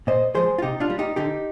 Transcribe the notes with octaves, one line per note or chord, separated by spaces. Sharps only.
A#2 C5 D#5
F3 G#3 G#4 C5
F4
C3 D#4 G4
D4 F4
G3
D#4 G4
D3 D#4 G4